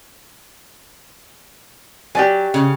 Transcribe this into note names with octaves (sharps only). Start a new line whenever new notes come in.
F#3 G4 D5 G#5
C#3